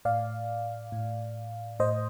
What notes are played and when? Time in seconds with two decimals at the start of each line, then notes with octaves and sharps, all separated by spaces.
0.05 A2 D5 F5
0.92 A2
1.80 A2 C5 D#5